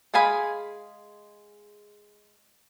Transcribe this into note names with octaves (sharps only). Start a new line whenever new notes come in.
G#3 G#4 F5 G#5 B5